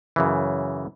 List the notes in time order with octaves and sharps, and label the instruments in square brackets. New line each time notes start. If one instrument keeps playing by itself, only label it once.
[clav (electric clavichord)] F#2 C#3 E3